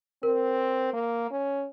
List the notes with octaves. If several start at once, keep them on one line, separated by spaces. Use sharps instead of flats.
C4 A#4
A#3
C#4